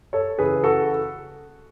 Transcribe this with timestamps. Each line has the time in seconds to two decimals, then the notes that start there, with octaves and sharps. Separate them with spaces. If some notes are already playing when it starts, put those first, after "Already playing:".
0.13 A4 C#5
0.38 C#3 E3 G#4 B4
0.64 F#4 A4